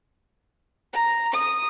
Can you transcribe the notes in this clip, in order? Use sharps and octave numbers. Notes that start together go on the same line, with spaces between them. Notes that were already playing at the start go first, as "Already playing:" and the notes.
A#5
D#6